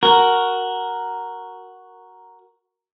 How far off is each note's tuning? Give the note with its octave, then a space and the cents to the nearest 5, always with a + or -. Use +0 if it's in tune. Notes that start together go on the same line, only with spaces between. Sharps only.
F#4 +0 A#4 +0